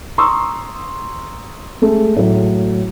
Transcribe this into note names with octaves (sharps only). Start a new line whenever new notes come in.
A#5 C6 C#6 D#6 E6
G#3 A3
A2 F#3